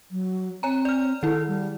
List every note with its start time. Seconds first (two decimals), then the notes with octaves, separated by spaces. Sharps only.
0.11 F#3
0.63 C4 C#5 G#5 A#5
0.85 D5 F6
1.23 D#3 E4 A4
1.48 G3